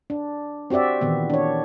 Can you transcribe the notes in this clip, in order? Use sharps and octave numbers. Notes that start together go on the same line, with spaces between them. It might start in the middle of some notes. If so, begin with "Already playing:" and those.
D4
C4 F#4 G4 D5 E5
A#2 D#3 E3 B3
D4 C#5